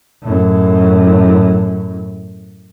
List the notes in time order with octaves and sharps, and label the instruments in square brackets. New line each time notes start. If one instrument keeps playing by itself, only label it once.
[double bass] F#2 A2